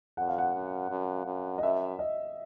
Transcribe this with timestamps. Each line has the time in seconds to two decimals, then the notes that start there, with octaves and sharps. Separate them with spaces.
0.17 F2 F#5
0.29 F5
0.38 F#5
0.54 F#2
0.90 F#2
1.26 F#2
1.58 D#5
1.63 F#2 E5
1.99 D#5